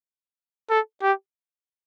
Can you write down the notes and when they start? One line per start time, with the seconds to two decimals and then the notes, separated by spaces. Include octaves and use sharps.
0.70 A4
1.02 G4